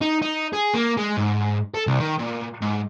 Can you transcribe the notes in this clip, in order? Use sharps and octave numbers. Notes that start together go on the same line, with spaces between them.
D#4
D#4
G#4
A#3
G#3
G#2
A4
C2
D#3
A#2
G#2